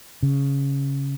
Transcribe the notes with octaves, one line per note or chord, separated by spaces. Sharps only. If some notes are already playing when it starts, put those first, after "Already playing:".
C#3